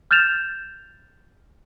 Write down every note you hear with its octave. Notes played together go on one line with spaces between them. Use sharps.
F6 G6 A6 E7 F7